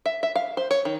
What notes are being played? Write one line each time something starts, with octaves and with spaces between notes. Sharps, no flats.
E5
E5
F5
C5
C#5
D#3